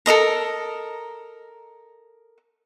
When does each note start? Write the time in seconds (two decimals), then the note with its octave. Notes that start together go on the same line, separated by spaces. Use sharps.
0.06 A4 A#4 D#5 A#5